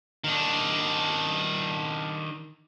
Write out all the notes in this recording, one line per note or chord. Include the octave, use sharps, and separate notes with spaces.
D#3 D4